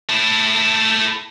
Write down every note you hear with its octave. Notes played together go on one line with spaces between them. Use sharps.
A3 E4